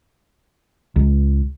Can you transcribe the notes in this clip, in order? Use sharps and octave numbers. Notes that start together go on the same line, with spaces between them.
C#2